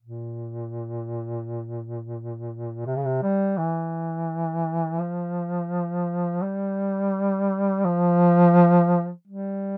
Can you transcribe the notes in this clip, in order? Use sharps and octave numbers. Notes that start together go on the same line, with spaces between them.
A#2
C3
C#3
C3
G3
E3
F3
G3
F3
G3